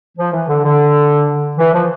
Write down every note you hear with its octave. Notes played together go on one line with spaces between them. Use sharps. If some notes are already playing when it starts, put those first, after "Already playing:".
F3
E3
D3
D3
E3
F3